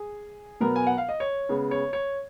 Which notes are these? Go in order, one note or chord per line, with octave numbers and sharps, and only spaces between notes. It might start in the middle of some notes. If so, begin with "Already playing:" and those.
Already playing: G#4
B2 F#3 B3 A#4
G#5
F#5
F5
D#5
C#5
C#3 G#3 B3
C#5
C#5